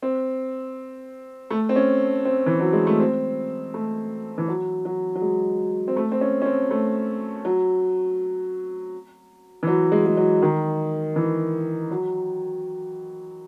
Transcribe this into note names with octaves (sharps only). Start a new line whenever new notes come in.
C4
A3
C4
C#4
C4
E3
F#3
G#3
A3
C4
A3
E3
F#3
F#3
F#3
G#3
C4
A3
C4
C#4
C#4
C4
A3
F#3
E3
F#3
G#3
G#3
F#3
D#3
E3
F#3